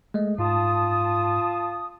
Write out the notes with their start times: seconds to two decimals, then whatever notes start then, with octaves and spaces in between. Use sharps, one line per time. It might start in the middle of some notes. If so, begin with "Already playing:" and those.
0.14 G#3 A3 D#5
0.39 G#2 F4 A5 D#6